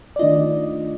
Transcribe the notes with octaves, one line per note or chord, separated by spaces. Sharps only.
D5
D#3 A3 D4 F4 D#5